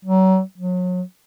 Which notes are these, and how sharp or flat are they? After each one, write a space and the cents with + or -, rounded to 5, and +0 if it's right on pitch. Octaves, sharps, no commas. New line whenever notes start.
F#3 +30
F#3 -35